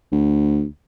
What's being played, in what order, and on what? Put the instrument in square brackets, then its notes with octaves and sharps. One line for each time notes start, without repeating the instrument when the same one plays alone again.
[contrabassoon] D2